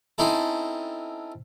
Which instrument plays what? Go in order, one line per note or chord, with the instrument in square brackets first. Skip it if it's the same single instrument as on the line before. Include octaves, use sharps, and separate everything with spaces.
[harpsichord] C4 C#4 D#4 E4 A4